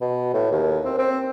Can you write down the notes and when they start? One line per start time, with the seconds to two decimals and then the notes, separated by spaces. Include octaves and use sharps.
0.01 B2
0.33 A2
0.51 D#2
0.85 C4
0.98 C4